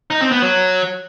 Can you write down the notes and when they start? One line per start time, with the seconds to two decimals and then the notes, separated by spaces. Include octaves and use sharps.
0.10 D#4
0.21 C4
0.31 B3
0.42 F#3